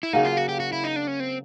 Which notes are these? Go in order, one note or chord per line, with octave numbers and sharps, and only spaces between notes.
E4
C#3 F#3 A#3 D#4
F4
F#4
G4
F#4
E4
D#4
D4
C#4
C4